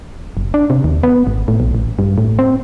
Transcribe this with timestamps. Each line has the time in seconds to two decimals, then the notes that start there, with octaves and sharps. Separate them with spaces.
0.37 F#1
0.54 D4
0.70 C3
0.84 D#2
1.03 B3
1.27 G#1
1.48 A2
1.60 B1
1.75 A1
1.99 G2
2.18 A2
2.39 C4